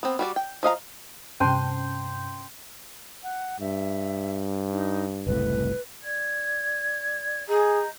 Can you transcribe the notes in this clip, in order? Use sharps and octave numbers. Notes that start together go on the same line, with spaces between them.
B3 C4
G3 F#4 D5
G5
F3 D#5 F5 A#5
G2 C3 C#4 C5 G5 A5 C6
F#5
G2 E5
D#4
F#1 C2 A2 B4
D5 G#6
G#4 D#5 A#5 G6